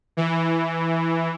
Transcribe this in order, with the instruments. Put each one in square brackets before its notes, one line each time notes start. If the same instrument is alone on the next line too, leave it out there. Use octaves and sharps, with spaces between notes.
[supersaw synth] E3